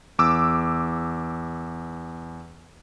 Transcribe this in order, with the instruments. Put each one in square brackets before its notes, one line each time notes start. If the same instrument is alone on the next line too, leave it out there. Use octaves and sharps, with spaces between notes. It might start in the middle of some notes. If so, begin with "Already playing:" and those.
[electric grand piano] E2 D6 E6